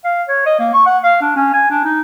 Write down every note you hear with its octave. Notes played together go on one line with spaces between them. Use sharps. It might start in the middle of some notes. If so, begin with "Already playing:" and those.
F5
C#5
D#5
A#3
C#6
F#5
F5
D4
C#4
G#5
D4
D#4